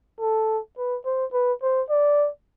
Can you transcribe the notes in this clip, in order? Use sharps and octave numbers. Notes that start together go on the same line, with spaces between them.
A4
B4
C5
B4
C5
D5